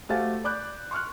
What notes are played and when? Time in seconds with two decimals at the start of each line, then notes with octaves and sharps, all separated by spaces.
0.09 A3 F#4 G4 C5 F5 A6
0.44 D5 B5 D6 F#6 G6
0.91 C6 C#6 F6 F#6